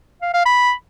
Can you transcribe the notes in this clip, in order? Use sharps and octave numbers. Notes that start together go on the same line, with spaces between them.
F5
F5
B5